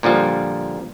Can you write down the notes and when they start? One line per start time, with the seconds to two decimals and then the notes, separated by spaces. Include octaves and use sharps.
0.03 A#2 D3 F3 G3